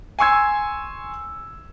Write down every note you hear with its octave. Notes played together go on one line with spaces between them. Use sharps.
G#5 C6 C#6 E6 G#6